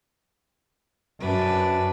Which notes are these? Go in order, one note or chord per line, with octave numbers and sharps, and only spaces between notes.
F#2 D4 B4